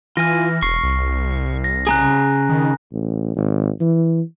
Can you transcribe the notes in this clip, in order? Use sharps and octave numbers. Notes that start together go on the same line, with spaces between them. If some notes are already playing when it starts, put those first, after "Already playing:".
E3 F4 G#5 F6 A#6
E1 C#6 C7
C2
A#6
C#3 A#3 G#4 G#5 A#5 F#6
D#3
A1
G#1
E3